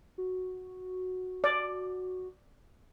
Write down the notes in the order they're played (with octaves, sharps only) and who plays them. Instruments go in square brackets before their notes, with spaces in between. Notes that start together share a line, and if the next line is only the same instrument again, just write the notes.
[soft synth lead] F#4
[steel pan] D5